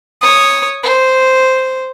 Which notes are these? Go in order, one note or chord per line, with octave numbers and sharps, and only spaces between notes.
C#5 D#6
C5